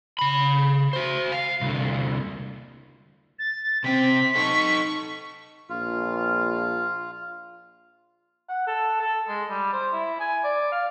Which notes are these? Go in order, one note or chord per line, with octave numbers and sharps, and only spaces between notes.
C#3 B5
F#4 C5
F5
C2 D3
A6
C3 C4 G5 B6
D#4 A4 C#6
A#1 F4
F#5
A4
A4
G#3
G3
C5
E4
G#5
D5
F5